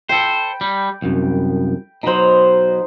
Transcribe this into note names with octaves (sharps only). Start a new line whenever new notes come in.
A4 C5 G5 B5
G3
C2 F#2
B2 F#3 D#4 C5